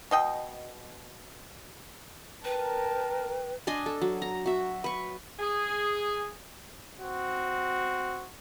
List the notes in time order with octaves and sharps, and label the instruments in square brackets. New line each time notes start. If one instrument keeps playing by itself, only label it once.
[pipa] B2 D#5 G5
[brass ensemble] A#4 [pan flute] B4 [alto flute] G5 [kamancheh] A5
[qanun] D4 D#5 G#5 C6
A4
F#3
A#5
F#4 E5
B4 C#6
[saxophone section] G#4
[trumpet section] C4 F#4